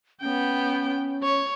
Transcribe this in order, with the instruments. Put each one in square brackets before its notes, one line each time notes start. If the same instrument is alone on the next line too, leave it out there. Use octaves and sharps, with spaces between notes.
[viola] B3 G5 [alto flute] C#4
[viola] C#5